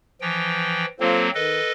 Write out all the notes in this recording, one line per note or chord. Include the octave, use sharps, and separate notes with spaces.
E3 F3 G5
F#3 A#3 C4 F4 A4 C5
D#3 A4 B4 D#5